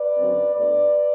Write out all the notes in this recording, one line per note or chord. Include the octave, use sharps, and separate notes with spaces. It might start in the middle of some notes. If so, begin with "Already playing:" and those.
Already playing: B4 D5
F#2 D3 F#3 C4
B2 A3 D4 B4 D5